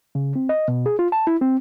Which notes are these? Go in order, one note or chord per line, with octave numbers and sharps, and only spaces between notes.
C#3
C4
D#5
B2
G#4
F4
A5
E4
C4